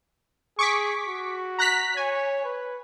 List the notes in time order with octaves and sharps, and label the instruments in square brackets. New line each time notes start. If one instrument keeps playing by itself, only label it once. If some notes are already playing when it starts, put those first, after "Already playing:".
[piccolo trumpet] G#4 [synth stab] C#6 D6 B6
[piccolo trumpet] F#4
[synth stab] A#5 F#6 B6
[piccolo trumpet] C#5 [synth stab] G#5
[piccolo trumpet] B4